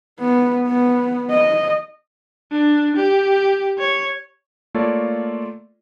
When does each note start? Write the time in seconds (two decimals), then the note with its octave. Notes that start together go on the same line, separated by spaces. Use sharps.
0.20 B3
0.67 B3
1.31 D#5
2.52 D4
2.97 G4
3.79 C#5
4.74 A3 A#3 F4 A4 C#5 D5